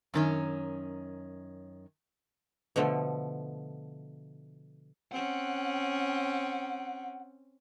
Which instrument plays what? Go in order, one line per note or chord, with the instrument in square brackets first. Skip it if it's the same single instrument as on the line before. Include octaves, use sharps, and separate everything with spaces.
[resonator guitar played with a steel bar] F#2 D#3 C#4
[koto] B2 D3 F3 A3
[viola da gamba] C4 C#4 [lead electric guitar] F#5